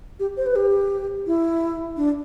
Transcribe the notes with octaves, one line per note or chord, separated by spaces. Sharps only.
G4
C5
B4
G4
E4
D4